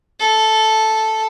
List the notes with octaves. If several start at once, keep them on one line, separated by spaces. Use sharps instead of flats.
A4